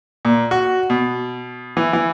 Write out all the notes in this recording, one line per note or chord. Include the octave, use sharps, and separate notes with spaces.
A#2
F#4
B2
E3
E3